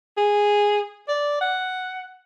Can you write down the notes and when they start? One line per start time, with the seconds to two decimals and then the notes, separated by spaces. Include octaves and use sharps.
0.17 G#4
1.08 D5
1.41 F#5